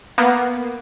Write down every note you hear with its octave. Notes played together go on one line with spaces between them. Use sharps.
A#3 B3